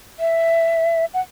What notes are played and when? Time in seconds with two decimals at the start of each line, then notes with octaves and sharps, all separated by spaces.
0.20 E5
1.14 F#5